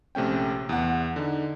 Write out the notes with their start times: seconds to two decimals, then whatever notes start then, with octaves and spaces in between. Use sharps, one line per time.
0.15 A#1 C3 A3 C#4 G5
0.69 E2 F#5
1.16 D3 D#4